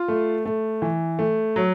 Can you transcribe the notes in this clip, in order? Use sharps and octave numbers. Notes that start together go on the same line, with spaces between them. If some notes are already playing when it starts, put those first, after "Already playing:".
Already playing: F4
A3
A3
E3
A3
F#3